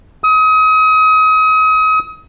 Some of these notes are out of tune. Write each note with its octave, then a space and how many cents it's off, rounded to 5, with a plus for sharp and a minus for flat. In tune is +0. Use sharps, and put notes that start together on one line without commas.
D#6 +35